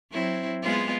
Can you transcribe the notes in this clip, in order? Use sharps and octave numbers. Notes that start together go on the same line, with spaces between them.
F#3 C4 E4
G#3 B3 F4